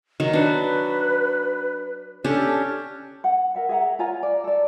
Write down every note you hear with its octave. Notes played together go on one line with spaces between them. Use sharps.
D#3 F#3
D4 F#4 B4
C#4 D4 G4 A4
F#5
A#4 E5 F#5
G#4 E5 F#5 A#5
F4 C#5 G#5 A#5
D5
A4 D5